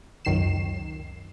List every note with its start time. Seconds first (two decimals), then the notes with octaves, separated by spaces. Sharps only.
0.25 C#2 F#2 D#3 C7 E7